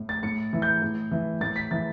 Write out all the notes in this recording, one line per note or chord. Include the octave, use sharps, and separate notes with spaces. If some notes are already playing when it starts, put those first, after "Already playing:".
Already playing: A2
A6
A2 C#7
E3
G6
A2
E3
A2 A6
B6
E3 A6